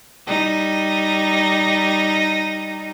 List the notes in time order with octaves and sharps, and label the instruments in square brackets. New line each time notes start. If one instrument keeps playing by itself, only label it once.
[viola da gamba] G3 D#4